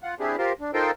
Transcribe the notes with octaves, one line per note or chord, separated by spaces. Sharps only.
F4 F#5
C4 D4 E4 G4 G#4
F4 G4 A#4 C5
D4
D#4 F4 A4 A#4 C5 G5